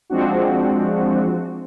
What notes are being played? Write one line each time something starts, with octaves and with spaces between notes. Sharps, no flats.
F3 G#3 C4 D4 F#4